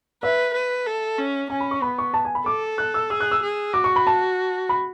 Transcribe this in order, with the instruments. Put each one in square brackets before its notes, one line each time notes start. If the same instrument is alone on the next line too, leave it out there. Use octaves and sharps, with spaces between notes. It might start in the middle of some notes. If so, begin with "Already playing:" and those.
[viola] B4 [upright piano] E5
[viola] B4
A4
C#4
[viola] C#4 [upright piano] G#5
[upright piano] B5
C#6
[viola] B3 [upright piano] B5
[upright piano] C#6
A5
G#5
B5
[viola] A4 [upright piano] D6
[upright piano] F#6
E6
[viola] G#4 [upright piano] E6
[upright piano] F#6
E6
[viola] G#4
[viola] F#4 [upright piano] D6
[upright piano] C#6
B5
A5
B5